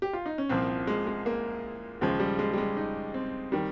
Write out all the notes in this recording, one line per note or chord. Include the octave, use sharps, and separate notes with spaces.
G4
F4
D#4
C#4
C2 A#2 F3 C4
G#3
G#3
A#3
D#2 C#3 F3 G#3
G3
G#3
G3
G#3
D#4
C4
D#3 G3